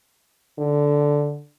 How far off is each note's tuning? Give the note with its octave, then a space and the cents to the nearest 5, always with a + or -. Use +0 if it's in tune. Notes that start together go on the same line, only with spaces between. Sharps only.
D3 -5